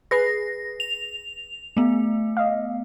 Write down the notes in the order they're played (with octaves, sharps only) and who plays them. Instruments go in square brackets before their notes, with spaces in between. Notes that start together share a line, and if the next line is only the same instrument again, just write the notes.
[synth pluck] G#4 B4 C7 [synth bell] A#6
[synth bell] F7
A3 B3
[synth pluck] D#5 F5